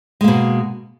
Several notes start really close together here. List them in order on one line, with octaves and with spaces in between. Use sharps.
G#3 A#3 B2